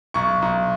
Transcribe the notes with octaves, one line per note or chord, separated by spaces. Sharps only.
B1 C#6
B1